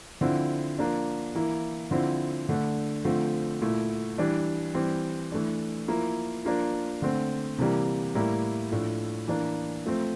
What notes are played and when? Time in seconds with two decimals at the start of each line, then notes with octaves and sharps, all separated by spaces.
0.21 D3 F3 C4 E4
0.79 F3 A#3 D4
1.35 E3 A#3 E4
1.91 D3 F3 C4 E4
2.49 D3 A3 D4
3.05 D3 F3 A3 C4
3.61 A#2 A3 E4
4.18 E3 G3 D4
4.74 E3 G3 C4
5.32 E3 A3 D4
5.88 F3 A#3 E4
6.45 F3 A#3 D4
7.02 D3 A3 C4
7.58 C3 E3 G3 A#3
8.15 A2 G3 A#3 E4
8.72 A2 F3 A3 D4
9.28 E3 A#3 D4
9.86 F3 A3 C4